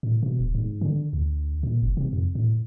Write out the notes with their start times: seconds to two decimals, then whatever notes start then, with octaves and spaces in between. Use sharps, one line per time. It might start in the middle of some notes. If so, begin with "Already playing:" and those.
0.03 A2
0.23 B2
0.40 D1
0.55 G#2
0.81 D3
1.13 D2
1.63 A#2
1.83 F#1
1.97 C3
2.13 F2
2.35 A2